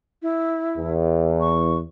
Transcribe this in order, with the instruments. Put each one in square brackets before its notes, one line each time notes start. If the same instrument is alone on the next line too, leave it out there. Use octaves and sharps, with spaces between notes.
[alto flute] E4
[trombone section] E2
[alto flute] C#6